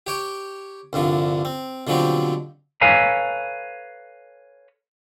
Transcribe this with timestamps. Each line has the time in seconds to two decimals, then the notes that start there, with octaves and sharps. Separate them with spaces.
0.07 G4 C#5 G5
0.93 C2 G2 D3 F3
1.45 C4
1.87 B2 D3 F3 F#3 C4 G4
2.81 A4 B4 C#5 F5 G#5 A#5